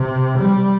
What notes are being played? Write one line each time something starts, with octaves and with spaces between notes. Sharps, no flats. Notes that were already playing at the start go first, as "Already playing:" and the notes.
Already playing: C3
G3